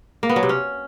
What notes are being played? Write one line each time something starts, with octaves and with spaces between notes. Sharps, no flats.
A#3
B3
F#3
C3
C#4